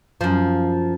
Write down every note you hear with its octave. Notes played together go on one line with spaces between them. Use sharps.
F#2 F3